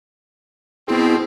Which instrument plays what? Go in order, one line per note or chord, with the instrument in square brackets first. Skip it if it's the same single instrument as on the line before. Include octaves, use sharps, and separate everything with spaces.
[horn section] B2 C4 [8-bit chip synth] B3 E4 G#4